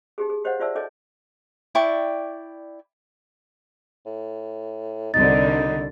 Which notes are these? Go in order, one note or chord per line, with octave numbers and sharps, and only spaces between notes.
D#4 G4 G#4
G#4
G4 C5 C#5 D#5 F5 F#5
F4 C5 D5 E5 A5 E6
D#4 A4 C#5 D#5 G#5
E4 D5 G5 C#6
A2
C2 D3 D#4 A6